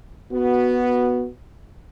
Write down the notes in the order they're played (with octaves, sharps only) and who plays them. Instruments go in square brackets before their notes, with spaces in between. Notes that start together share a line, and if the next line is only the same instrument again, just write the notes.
[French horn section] B3 F#4